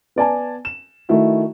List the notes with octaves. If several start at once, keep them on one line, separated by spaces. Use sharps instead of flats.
B3 D5 G#5 A5
E7
D#3 A3 E4 F#4